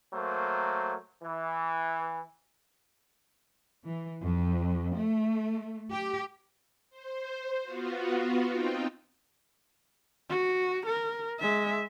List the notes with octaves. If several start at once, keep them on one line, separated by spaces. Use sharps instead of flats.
F#3 A3 A#3 A#4 C5
E3
E3
F2
A3
G4
C5
B3 F4 F#4
C4 D#4 F4 G5
F#4
A#4
G#3 E5